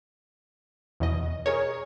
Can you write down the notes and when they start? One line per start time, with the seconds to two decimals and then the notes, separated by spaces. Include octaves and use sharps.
1.00 E2 B2 D#5
1.46 G#4 A#4 C#5